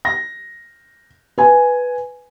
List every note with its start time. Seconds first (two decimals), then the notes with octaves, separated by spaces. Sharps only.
0.05 A#6
1.38 B4 G#5